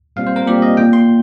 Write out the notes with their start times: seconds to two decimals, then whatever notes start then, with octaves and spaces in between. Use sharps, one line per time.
0.16 A#2 G3 C4 F5
0.27 C5
0.36 A#4
0.47 A#2 G3 C4 G4
0.62 D#5
0.77 A#2 A#3 G5
0.93 C6